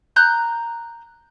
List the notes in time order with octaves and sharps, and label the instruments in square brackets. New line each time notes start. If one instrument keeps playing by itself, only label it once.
[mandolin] A#5 F#6 G6